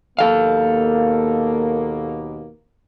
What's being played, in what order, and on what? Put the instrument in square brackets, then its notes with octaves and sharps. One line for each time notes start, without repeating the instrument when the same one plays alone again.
[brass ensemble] D#2 B2 A#3 [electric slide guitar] A4 F5